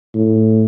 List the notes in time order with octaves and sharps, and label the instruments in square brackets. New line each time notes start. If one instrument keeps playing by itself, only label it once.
[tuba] A2